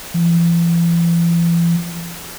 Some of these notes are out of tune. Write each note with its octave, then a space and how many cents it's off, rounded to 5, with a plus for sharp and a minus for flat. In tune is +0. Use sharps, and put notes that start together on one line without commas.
E3 +45